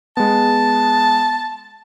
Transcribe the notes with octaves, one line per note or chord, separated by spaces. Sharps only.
G#3 B3 A5